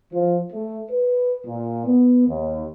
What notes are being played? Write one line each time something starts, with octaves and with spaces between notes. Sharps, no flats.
F3
A3
B4
A#2
B3
D#2